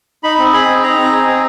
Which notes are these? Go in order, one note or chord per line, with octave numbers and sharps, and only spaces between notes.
D#4 B5
C4
G#4 B5
C4
D#4 A#5
C4
G#4
C4